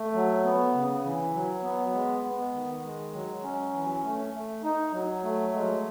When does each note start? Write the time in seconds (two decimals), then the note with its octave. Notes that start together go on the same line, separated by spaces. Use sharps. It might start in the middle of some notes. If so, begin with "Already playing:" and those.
Already playing: A3
0.14 F#3
0.45 B3
0.74 C#3
1.04 E3
1.34 F#3
1.63 B3
1.94 G#3
2.24 B3
2.53 D#3
2.84 G#3
3.13 F#3
3.43 C#4
3.73 E3
4.03 A3
4.34 A3
4.64 D#4
4.93 F#3
5.24 A3
5.54 G#3